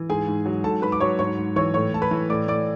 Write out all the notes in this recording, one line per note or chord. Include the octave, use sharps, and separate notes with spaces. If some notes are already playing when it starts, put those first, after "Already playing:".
Already playing: E3
G#2 G#4 G#5
G#2
F#3
G#2 A4 A5
G#2 B4 B5
D6
F#3 C#5 C#6
G#2 C#5 C#6
G#2
E3 C#5 C#6
A2 C#5 C#6
A2 A5
B4 B5
E3
A2 D5 D6
A2 D5 D6